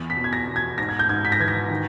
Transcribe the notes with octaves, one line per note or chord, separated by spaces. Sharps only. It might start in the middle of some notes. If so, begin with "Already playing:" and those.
Already playing: E2
B6
B2
G#6
A#6
B2
G#6
G#2 A#6
G#6
G6
G#2 G#6
B6
A#6
E3 G#6
A#6
D#3